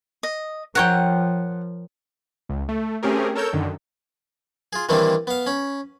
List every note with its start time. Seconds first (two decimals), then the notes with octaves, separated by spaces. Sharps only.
0.23 D#5
0.75 F3 A#4 C#5 F#5 G5
2.49 C#2
2.69 A3
3.03 A3 C4 C#4 G4 G#4 A#4
3.35 A4 A#4 C#5 E6 G6
3.53 F#2 D3 D#3
4.73 F4 G#4
4.89 D#3 E3 G3 A#3 C4 D4
5.27 B3 F5
5.46 C#4 B5